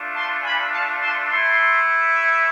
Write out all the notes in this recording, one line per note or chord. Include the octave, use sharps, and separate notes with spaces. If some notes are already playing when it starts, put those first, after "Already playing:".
Already playing: A3 D4 F4
A5 C6
G#5 B5
F5 A5
A5 C6
A3 E4 A5 C6